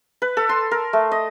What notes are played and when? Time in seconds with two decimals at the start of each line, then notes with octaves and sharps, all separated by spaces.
0.22 B4
0.37 A4
0.49 C6
0.71 A#4
0.93 A3
1.12 D#5